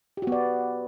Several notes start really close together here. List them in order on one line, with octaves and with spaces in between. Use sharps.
G4 F#4 B3 D5